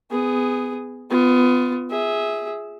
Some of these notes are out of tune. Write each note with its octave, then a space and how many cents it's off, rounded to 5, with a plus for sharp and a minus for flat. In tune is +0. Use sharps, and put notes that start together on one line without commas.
B3 +25 G#4 -5
B3 +25 F4 +0
G#4 +0 E5 -15